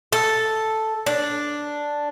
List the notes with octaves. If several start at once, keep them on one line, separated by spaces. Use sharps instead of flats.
A4
D4